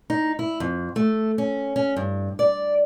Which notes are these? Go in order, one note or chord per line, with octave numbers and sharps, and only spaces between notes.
D#4
E4
F2
A3
C#4
C#4
G2
D5